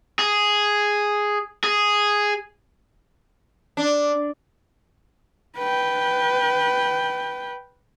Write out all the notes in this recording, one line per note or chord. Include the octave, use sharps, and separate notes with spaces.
G#4
G#4
D4
B4 G5